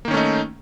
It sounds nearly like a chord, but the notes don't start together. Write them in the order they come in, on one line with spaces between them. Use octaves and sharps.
A#3 D#3 C#4 A3 D#4